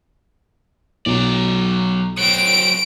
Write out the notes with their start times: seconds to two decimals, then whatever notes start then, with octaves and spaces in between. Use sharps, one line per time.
1.06 B1 F#3 D5
2.19 F#3 C4 D7